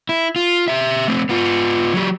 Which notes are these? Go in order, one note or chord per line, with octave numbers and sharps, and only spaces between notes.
E4
F4
G4 E5
A3 C4
B3 F4
F#3 G4